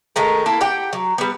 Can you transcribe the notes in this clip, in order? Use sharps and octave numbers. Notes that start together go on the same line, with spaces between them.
D#3 G#3 A3 A#4
A#3 E4 A4
G4 F#5 G5
F#3
G3 B3